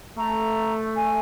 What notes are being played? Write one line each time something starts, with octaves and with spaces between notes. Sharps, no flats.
A3 A#5
G#5